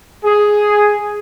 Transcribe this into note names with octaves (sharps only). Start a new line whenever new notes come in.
G#4